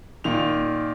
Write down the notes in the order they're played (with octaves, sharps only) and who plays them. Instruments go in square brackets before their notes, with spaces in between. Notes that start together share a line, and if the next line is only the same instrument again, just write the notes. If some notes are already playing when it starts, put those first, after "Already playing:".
[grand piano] A#2 D#3 F7